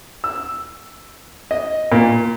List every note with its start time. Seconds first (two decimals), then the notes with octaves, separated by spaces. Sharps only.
0.24 E6
1.51 D#5
1.92 A#2